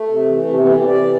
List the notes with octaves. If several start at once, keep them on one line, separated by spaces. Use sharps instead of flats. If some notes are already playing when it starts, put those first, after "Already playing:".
Already playing: A3
C3
E3
C3
E3 B3
E4
C3 G4
D5
E3